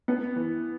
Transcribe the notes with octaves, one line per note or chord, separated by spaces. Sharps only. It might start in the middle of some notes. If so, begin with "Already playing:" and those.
B3
E3